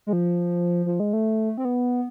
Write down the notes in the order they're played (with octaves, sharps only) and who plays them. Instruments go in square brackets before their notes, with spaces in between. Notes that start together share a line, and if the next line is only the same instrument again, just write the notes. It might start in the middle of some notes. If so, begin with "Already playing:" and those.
[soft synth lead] G#3
F3
F3
G#3
A3
C4
B3